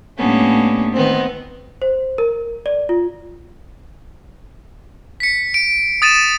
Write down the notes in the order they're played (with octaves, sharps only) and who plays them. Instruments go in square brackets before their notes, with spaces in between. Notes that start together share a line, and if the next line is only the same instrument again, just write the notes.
[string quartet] A2 G3 A#3 B3 C#4 D4
D#3 B3 C4
[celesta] C5
A#4
D5
F4
[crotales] B6 C#7
D7
D#6 A6 D#7 E7